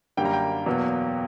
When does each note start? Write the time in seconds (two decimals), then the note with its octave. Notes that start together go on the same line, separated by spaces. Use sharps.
0.17 F#2 D3 G3 A#3 G5
0.25 A#5
0.33 G5
0.66 E2 B2 F#3 A#3